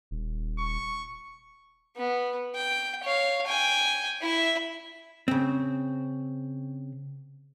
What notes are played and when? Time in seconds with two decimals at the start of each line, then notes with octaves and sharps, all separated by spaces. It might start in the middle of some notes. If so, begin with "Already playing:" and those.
0.11 D#1
0.59 C#6
1.97 B3
2.55 G5
3.04 C#5 F5
3.47 G5 G#5
4.22 E4 E5
5.28 C#3 C4